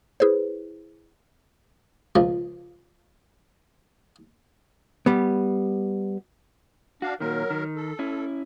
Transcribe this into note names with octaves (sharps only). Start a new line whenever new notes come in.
E4 G#4 B4 C5
C#2 F3
G3 B3
D4 F#4 F5
A#2 D#3 F#3 A#4
D#3
A4
C#4 E4